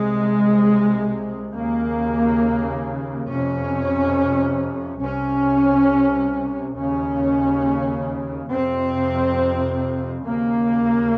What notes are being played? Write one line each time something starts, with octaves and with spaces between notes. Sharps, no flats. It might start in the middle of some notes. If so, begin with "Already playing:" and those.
Already playing: C2 C3 G#3
D#2 C#3 A#3
F2 C3 C#4
C2 C3 C#4
D#2 C#3 C#4
F2 C3 C4
D#2 C#3 A#3